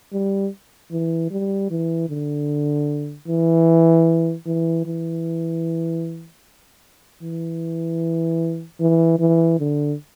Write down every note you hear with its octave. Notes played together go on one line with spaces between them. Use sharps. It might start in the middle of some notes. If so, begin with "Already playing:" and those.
G3
E3
G3
E3
D3
E3
E3
E3
E3
E3
E3
D3